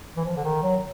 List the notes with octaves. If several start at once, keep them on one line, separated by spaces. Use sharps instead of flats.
E3
F3
D3
D#3
F#3